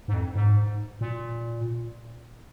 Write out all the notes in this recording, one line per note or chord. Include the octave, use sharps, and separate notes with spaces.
G#2
F2
G#2
A#2